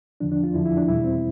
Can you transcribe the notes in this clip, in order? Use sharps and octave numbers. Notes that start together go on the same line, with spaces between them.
E2 D3 F3 D4
D4
F4
E2 D3 F3 E4
E4
D4
E2 B2 G3 E4
C4